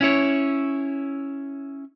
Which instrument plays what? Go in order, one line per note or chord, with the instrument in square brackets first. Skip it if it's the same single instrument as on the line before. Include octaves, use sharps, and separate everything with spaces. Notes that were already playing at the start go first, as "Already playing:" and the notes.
[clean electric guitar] C#4 E4 C#5